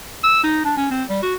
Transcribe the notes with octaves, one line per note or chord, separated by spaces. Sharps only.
E6
D#4
D4
C#4
C4
G3
F#4